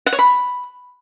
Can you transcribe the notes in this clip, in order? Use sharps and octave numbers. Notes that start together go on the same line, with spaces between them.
F#5
C#5
B5